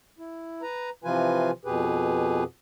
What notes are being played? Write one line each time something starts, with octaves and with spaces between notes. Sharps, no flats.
E4
B4 A#5
C3 E3 F3 F4 B4 G#5
F2 B2 G4 G#4 B4